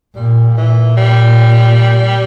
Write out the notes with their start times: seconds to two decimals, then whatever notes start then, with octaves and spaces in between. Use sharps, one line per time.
0.16 A#2 G3
0.57 A#2 E3
0.97 G3